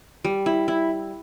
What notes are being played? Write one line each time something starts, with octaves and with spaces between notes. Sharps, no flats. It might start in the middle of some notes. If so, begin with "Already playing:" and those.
G3
E4
E4